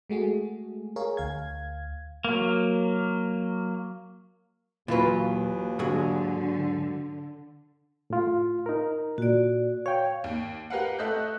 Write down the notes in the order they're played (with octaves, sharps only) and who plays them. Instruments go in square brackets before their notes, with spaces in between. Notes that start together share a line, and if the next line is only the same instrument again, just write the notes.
[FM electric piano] G#3 A3 F#4 G#4
G#4 A#4 C#5 F5
D2 F5 G#6
[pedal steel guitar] F#3 A#3
[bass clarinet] D#2 [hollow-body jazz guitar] A#2 F#3 [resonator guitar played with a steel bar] E3 F4 B4
[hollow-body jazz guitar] G#2 F#3 G#4 [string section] D3
[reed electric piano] A2 F4
D#4 A#4
[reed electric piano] A#2 [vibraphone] F#4 D5
[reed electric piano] C#5 G5 [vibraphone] F5
[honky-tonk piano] D#2
G4 A#4 B4 F5 F#5
A3 A4 D#5 E5 F#6 G6